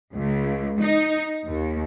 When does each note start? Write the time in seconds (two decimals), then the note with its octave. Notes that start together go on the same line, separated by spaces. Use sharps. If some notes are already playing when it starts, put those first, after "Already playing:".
0.13 C#2
0.79 D#4
1.46 D#2